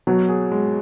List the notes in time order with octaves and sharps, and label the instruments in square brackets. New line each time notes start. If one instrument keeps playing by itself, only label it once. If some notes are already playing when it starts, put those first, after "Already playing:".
[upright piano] B2 [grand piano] F#3
[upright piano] G#4
G#3